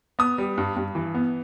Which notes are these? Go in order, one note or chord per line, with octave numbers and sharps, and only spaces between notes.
B3 D#6
G3
G2
G2
E3
B3